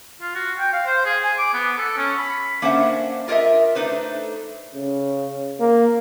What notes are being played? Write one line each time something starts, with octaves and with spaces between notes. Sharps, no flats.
F4
F#4
G5
F5
C5
G#4
G#5
D6
B3
A4
C#4
B5
A#3 C#4 D4 C5 E5 F#5
F4 A#4 C#5 D#5 E5
A3 D4 D#4 B4 C5
C#3
A#3